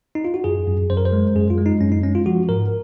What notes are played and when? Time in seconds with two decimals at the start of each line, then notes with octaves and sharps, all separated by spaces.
0.15 D#4
0.25 F4
0.34 F#4
0.44 F#2 G#4
0.68 F#2
0.90 F#2 C5
0.97 A#4
1.05 C5
1.12 G#3
1.35 F#2 G#4
1.50 F4
1.58 G#3
1.66 D#4
1.81 F#2 C#4
1.92 D#4
2.03 G#3 C#4
2.15 F4
2.26 F3 F#4
2.49 G#2 A#4